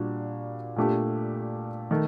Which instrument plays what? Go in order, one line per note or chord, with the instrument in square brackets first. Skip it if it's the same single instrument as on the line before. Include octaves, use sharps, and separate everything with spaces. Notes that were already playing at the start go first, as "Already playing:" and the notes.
Already playing: [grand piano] A#2 G3 D4 F#4
A#2 A3 D4 G4
D#3 A3